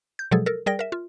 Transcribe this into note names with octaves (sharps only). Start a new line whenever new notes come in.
G6
B2 F3 F#3 G#3 G#4 A4
A4 A#4
G3 G#4 A#4 D5 G5 A#6
A#4 E5
F4